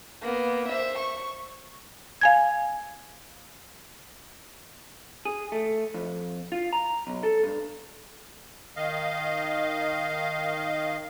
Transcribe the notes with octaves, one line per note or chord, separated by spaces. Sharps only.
A#3 B3
C5 E5
C#6
F5 G#5 G#6
G#4
A3
F2
F4
A#5
B1
A4
G2
D#3 D#5 F5